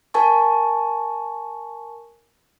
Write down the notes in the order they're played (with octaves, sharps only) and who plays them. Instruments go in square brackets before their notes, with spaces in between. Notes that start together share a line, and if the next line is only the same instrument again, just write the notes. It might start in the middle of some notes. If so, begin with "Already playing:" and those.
[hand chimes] A#4 G#5 A5 C#6